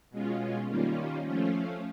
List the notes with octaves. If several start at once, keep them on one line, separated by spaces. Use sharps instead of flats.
B2 G#3 C#4 F4
D#3 G3 A#3 C#4 F4
F3 A3 C#4 F4